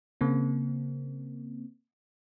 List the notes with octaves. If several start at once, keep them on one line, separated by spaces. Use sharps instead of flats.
C#3 A#3 C4